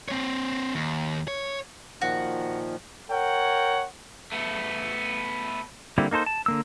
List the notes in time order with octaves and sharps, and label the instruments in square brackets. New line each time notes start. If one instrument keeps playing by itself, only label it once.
[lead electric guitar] C4 C#5
D#2
C#5
[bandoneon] A#2 D#3 F3 [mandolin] F#4
[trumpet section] A#4 C#5 F#5 G5
[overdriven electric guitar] A3 B3
[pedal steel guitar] D3 G3 A#3 C4 E4
A#3 D#4 A4 C5
A5
D3 A#3 E6